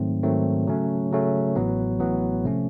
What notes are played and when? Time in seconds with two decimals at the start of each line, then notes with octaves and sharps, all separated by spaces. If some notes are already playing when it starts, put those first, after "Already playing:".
Already playing: G#2 D#3 F#3 A3 C4
0.23 G#2 D#3 F#3 A3 C4
0.67 C#3 F#3 A3 C#4
1.11 C#3 F#3 A3 C#4
1.56 A1 A2 F#3 B3
2.00 A1 A2 F#3 B3
2.45 C3 F3 A3 C#4